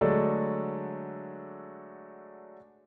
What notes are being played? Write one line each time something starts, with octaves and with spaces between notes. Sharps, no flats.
D3 F#3 G#3 A3 D4 A4